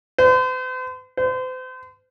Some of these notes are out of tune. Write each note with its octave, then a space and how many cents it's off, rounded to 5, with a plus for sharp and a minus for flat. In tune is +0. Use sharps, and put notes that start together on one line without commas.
C5 -45
C5 -40